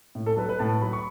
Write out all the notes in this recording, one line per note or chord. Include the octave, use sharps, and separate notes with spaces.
A2
A4
F#3 B4
B4
A2 A5
F#3 B5
C#6